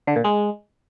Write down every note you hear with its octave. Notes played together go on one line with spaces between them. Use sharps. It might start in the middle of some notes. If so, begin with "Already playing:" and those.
D3
A#2
G#3